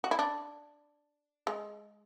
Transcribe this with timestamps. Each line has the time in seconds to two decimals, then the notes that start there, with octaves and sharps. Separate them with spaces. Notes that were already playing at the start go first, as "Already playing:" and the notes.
0.04 F#4
0.11 E4
0.19 D4
1.47 G#3